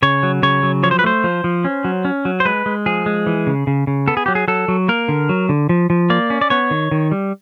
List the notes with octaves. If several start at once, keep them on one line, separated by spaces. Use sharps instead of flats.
C#3 C#5
F#3
C#3 C#5
F#3
F3 C#5
C5
B4
A3 C5
F3
F3
C#4
F#3
C#4
F#3
C5
G#3 B4
G#3
F3 G#4
G#3
E3
C#3
C#3
C#3
B3 A4
G#4
F#3 G4
G#4
F#3 A4
F#3
A#3 A#4
D3
F#3
D3
F3
F3
A#3 D5
C#4
D5
B3 C#5
D#3
D#3
G3